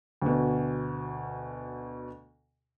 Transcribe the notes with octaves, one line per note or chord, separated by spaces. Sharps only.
D2 B2